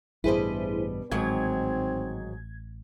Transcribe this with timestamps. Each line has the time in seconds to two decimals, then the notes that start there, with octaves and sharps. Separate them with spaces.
0.24 A1 G2 B2 G3 E4 G#4 B4 C5
1.11 A1 G#2 D#3 F#3 C4 G#6